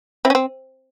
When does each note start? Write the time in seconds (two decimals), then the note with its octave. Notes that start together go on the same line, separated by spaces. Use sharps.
0.25 C4 E4
0.30 C#4
0.35 C4